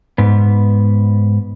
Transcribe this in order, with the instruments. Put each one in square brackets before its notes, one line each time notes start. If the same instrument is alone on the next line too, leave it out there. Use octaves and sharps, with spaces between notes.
[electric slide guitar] G#2 B3